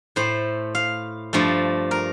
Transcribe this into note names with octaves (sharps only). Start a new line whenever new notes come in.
A2 A3 C5
F5
G2 F3 A3
A#4